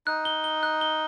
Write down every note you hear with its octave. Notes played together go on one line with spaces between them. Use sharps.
D#4 F#6
G7
G7
F#6
G7